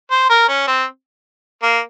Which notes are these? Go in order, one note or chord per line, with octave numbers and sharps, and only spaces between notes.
C5
A#4
C#4
C4
A#3